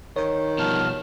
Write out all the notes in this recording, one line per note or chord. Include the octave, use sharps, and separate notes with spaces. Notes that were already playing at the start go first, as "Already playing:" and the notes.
D#3 C#5
B2 F3 G3 A5 F6